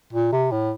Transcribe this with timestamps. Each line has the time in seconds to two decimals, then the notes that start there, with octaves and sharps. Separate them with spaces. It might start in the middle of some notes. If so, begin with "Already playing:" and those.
0.13 A#2
0.32 C3
0.52 A2